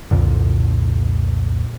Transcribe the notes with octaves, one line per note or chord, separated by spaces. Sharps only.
C2 F2 A#2 D3